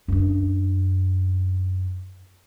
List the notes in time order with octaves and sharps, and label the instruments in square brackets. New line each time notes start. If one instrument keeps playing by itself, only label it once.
[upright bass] F#2 D4